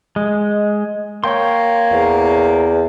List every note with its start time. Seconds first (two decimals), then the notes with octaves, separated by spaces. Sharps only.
0.16 G#3
1.24 A#3 C#5 G5 C6
1.92 E2